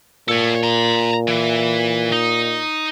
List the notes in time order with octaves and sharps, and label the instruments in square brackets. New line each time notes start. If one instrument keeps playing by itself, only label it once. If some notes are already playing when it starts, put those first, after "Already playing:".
[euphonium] A#2 [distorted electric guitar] A4 C#5
[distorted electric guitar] A#5 C6
E3
D#4